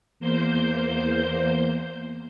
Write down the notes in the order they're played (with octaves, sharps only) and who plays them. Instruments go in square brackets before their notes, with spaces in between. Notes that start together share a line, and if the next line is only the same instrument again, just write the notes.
[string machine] E2 A#3 C5 G6